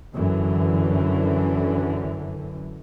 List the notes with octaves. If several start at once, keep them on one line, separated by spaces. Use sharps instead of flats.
F#2 D3 E3